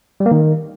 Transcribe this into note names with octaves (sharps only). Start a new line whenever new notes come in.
G3
A#3
D#3